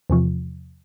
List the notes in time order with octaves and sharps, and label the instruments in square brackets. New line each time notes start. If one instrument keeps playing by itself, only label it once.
[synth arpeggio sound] E2 C3 F3